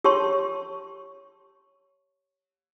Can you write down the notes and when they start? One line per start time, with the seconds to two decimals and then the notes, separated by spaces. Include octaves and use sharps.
0.04 G4 C#5 A5 C6 C#6